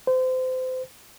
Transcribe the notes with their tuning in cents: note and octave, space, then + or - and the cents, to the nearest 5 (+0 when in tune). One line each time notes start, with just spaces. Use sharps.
C5 -30